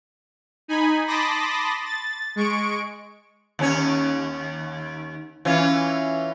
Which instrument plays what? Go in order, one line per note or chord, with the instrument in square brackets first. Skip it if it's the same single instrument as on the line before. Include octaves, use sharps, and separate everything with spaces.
[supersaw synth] D#4 G#5 B5
A5 B5 C6 D6 D#6 A#6
A6
G#3 C#6 D7
[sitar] D#2 C#4 C#5
E3 C#4 F4